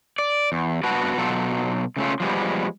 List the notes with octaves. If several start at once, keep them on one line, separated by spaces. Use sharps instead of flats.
D5
E2
G2 B3 F#4 B4 A5
B2 F#3 F4 A4
C#3 A3 C#4 F4
F3 G3 G#3 B3